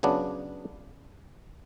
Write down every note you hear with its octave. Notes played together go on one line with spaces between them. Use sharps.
C#3 F#3 B3 D4